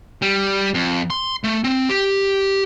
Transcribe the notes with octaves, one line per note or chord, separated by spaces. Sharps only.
G3
F2
C6
A3
C4
G4